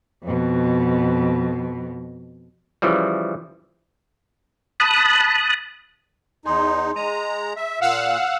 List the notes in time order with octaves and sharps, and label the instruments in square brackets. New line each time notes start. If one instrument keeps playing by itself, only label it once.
[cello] F2 B2
[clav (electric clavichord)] C#3 E3 F3 G3
[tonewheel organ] A5 B5 D#6 F#6
[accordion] E2 D#4 [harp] G#4 C6
[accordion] G#3 A#5 [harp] D#7
[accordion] E5
[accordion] A#2 [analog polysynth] F5 F#5 E6